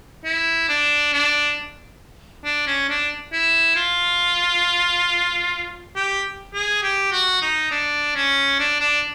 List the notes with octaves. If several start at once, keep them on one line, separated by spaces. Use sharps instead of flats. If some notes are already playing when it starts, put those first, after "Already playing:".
E4
D4
D4
D4
C#4
D4
E4
F4
G4
G#4
G4
F#4
D#4
D4
C#4
D4
D4